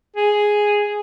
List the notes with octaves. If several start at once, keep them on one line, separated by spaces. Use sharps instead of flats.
G#4